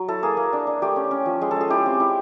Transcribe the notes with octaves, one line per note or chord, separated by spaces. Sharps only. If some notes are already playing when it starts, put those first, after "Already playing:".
Already playing: F#3
E4 A4
A#3 G#4
A#3
D4
D4
A3 G4
C#4
C#4
F3
G#3 G#4
A4
G#3 G#4
E4 G4
C4
E4